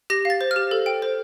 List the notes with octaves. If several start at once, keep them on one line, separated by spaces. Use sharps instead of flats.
G4 A#6
F5 A6
C5
F6
G4
A4
G5
C5